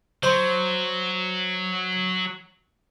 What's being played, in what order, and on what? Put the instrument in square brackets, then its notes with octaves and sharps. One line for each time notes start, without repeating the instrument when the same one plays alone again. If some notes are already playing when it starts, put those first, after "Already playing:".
[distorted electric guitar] F#3 [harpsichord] C5